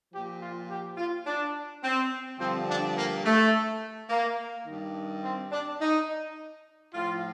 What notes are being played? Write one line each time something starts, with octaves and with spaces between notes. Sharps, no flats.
A#2 F3 G4
F4
G4
F4
D4
C4
G2 D3 F3 C4
D4
A#3
A3
A#3
G2 D#3
C4
D4
D#4
A2 F3 F4